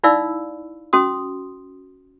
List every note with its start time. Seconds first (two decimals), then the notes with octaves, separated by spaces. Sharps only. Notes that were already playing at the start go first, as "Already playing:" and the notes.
0.04 D#4 E4 D5 F5 B5 E6
0.93 C#4 F#4 C6 D#6